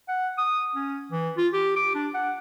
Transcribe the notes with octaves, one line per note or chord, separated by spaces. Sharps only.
F#5
D#6
C#4
E3
F4
G4
D6
D4
F#5